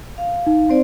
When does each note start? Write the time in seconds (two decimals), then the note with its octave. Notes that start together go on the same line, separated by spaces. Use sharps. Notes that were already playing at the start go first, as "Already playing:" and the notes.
0.18 F5
0.47 D#4
0.69 C4 C5 D5